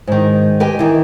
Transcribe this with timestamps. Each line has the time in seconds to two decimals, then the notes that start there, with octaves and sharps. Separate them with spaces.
0.07 G#2 D#3
0.60 G4 B4 D#5 G5 G#5
0.79 D#3 E3